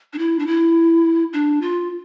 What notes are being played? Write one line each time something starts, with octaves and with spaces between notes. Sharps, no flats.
D4
E4
D4
E4
D4
F4